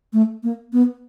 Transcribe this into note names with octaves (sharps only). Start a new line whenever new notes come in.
A3
A#3
B3